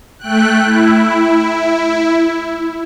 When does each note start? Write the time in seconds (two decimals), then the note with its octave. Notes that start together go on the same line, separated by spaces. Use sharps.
0.19 A3 G5 F#6
0.65 E4